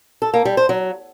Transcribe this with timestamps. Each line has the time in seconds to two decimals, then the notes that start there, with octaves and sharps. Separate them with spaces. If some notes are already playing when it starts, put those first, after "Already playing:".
0.22 A4
0.34 A#3
0.45 G3
0.57 C5
0.69 F#3